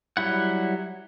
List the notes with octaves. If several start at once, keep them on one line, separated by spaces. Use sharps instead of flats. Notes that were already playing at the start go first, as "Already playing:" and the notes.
F#3 G3 E4 F#5